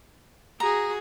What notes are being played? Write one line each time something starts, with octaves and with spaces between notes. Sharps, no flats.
F#4 G#4 A#5